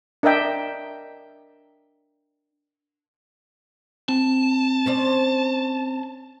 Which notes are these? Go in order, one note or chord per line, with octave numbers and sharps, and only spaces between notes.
D4 A#4 D#5 E5 G5
C4 A5
C#4 C5 D5